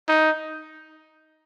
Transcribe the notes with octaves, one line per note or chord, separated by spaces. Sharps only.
D#4